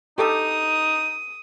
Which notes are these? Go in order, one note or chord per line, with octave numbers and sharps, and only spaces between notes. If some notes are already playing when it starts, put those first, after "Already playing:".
D#4 G4 A4 D#6